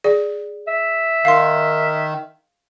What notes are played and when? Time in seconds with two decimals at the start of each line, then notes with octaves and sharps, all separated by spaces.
0.04 G#4 D5
0.67 E5
1.25 D#3 F5 C6